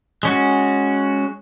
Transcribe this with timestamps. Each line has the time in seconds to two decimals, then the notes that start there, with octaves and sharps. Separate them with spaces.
0.23 G#3 C#4 F#4